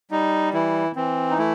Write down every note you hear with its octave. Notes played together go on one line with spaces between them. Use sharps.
G3 D#4
E3 E4
E3 C4
D#4
A3 E4